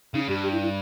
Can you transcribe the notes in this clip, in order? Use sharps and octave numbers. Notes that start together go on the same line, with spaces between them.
C#3 D#4
G2 G4
G4
E4
E4